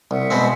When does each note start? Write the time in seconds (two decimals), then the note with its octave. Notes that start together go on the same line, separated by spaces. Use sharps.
0.11 C2 E5 F#5
0.30 B2 G#3 C4